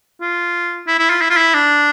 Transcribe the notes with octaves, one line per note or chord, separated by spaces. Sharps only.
F4
E4
E4
F4
E4
F4
E4
D4